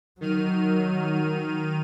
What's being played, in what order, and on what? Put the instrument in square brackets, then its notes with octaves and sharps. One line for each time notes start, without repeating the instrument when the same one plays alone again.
[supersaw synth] D#3 F6 D#7 [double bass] F#3